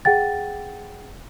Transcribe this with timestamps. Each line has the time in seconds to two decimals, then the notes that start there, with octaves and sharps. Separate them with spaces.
0.05 G#4 F#5 G5 A6